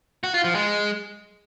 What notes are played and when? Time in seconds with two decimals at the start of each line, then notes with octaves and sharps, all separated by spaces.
0.24 F#4
0.34 F4
0.44 F3
0.55 G#3